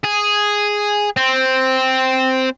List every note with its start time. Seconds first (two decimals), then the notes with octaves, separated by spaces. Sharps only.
0.04 G#4
1.17 C4